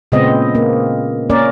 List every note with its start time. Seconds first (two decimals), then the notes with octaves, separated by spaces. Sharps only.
0.12 A#2 C#3 G#3 B3 C4 D#5
0.55 A#3
1.30 A#3 C#4 A#4 D5